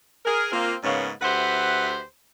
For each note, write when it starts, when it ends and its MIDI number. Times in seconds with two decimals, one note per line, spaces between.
0.25 0.51 68
0.25 0.51 70
0.52 0.74 58
0.52 0.74 60
0.52 0.74 65
0.84 1.09 44
0.84 1.09 49
0.84 1.09 58
0.84 1.09 59
0.84 1.09 61
1.22 2.00 38
1.22 2.00 67
1.22 2.00 71
1.22 2.00 72
1.22 2.00 76
1.22 2.00 78